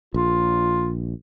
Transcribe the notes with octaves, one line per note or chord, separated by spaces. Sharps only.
A#1 F4